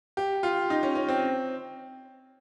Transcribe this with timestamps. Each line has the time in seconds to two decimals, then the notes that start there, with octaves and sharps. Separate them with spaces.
0.17 G4
0.43 F4
0.70 D#4
0.83 C#4
0.95 C#4
1.09 C4